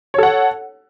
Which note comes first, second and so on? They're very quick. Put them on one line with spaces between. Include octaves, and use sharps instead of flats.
C#5 A4 F#5